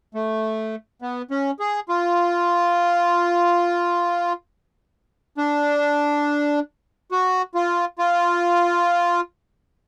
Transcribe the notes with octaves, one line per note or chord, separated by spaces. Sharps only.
A3
B3
C#4
G#4
F4
D4
F#4
F4
F4